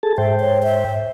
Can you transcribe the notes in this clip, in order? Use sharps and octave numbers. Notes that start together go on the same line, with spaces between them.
G#4 A4 A5
G#2 C5 E5 G5
C#5
E5